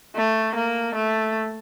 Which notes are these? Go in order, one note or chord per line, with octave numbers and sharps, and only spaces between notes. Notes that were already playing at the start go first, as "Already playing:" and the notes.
A3
A#3
A3